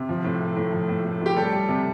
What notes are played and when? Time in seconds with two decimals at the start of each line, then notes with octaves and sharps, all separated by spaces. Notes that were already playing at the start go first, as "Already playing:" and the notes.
Already playing: C3
0.09 F3
0.24 A2
0.40 A3
0.56 A2
0.73 F3
0.89 A2
1.05 A3
1.21 A2 G4
1.36 G3 A4
1.52 G3
1.68 C3